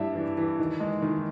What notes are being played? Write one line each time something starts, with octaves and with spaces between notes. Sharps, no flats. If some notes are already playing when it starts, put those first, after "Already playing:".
Already playing: G2 G3 E4 E5
E3
E3
D#3
G#3
D#3